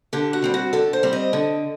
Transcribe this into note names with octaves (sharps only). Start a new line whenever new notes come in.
D3 G4
F#4
G3 C4
F#4
D3 A4
C5
G3 C4
D#5
D3